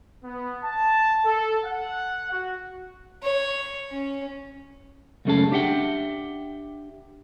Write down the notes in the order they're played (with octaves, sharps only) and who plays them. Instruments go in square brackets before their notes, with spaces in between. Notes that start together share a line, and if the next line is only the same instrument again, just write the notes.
[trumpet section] B3
A5
A4
F#5
F#4
[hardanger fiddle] C#5
C#4
[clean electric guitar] C#2 F#2 A3 C#4 G#4 A5
D4 G4 E5 F#5 G5